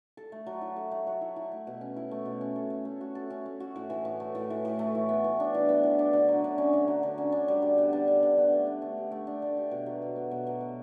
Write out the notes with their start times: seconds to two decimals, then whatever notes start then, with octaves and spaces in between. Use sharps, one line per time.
0.17 A4
0.32 A3
0.47 F#3
0.61 E4
0.76 A4
0.91 A3
1.07 F#3
1.21 E4
1.36 E4
1.52 A3
1.67 B2
1.81 C#4
1.96 E4
2.11 A3
2.25 B2
2.41 C#4
2.56 A4
2.70 C#4
2.85 A3
3.01 F#4
3.15 A4
3.30 C#4
3.46 A3
3.60 F#4
3.76 A2
3.90 E3
4.05 A2
4.20 A3
4.35 A2
4.50 E3
4.65 A2
4.79 A3
4.95 E3
5.09 B3
5.24 E3
5.40 D4
5.54 E3
5.69 B3
5.83 E3
5.99 D4
6.13 D3
6.29 F#3
6.44 D3
6.58 C#4
6.73 D3
6.88 F#3
7.03 D3
7.18 C#4
7.32 D4
7.48 G3
7.62 D3
7.78 B3
7.93 D4
8.08 G3
8.23 D3
8.38 B3
8.52 A3
8.67 D4
8.82 A3
8.97 G4
9.11 A3
9.27 D4
9.42 A3
9.57 G4
9.71 B2
9.86 F#3
10.02 B2
10.16 B3
10.31 B2
10.47 F#3
10.61 B2